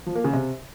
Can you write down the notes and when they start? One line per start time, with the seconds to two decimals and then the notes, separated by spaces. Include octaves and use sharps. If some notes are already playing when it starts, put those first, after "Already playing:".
0.06 F3
0.15 A#3
0.24 C#3
0.33 C3